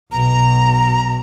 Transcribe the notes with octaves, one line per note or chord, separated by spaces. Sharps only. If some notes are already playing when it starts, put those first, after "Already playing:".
B1 B2 A#5